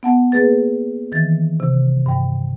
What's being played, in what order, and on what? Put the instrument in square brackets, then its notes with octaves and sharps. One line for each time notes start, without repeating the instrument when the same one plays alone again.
[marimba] B3 F#5 A5
A#3 G#4 B4 A6
D#3 E3 A6
C3
G2 G5